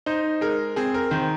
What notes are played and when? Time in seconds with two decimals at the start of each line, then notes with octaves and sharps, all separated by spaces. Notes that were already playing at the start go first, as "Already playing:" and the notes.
0.06 D#4 C5
0.41 G#3 A#4
0.76 C4 G#4
0.94 A#4
1.11 D#3 C5